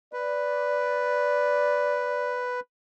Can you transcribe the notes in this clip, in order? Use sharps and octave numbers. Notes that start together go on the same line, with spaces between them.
B4 D5